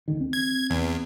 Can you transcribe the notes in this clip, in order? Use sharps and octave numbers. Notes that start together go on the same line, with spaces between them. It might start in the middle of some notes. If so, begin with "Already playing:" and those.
D2 D3 D#3
C4
G#6
E2